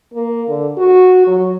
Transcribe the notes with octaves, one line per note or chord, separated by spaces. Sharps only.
A#3
D3
F#4
F#3